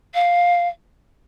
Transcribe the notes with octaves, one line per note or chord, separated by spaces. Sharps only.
F5